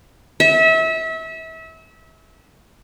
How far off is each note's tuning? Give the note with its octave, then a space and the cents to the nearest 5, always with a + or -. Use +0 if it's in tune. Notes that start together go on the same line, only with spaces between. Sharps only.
E5 -30